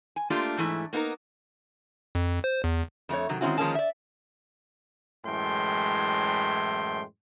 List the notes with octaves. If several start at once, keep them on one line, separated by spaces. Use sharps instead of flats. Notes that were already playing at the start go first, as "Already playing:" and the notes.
G#5
A3 A#3 D4 F4 G4
G#2 E3 A3 E4
A#3 B3 D#4 A4 A#4
F2
C5
E2
F2 A3 F#4 C#5
C3 D#3 F#3
D#3 G#3 C4 C#4 E4 F#4
D#3 F3 G#3 A#3 C#4 A5
D5 E5
F#2 A2 E3 G#3 G5 C6